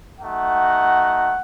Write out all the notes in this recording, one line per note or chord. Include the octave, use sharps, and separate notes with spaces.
A3 D#4 F#4 F#5